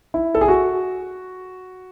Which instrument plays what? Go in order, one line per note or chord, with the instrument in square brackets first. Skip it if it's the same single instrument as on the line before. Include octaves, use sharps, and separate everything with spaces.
[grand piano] E4
A4
G#4
F#4